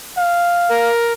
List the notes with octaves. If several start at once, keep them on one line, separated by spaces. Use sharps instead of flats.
F5
A#4